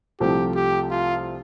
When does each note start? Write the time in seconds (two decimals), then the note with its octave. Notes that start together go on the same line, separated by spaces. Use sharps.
0.20 C2 C3 F3 A3 G4
0.56 G4
0.91 F4